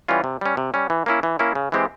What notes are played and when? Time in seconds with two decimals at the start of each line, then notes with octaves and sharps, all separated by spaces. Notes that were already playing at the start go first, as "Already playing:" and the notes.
0.08 E3 G3 C#4 F4
0.24 C3
0.41 G3 C#4
0.57 C3
0.74 G3 C#4
0.90 E3
1.06 A#3 C#4 E4
1.23 E3
1.39 A#3 C#4 E4
1.55 C#3
1.72 E3 G#3 C4 G4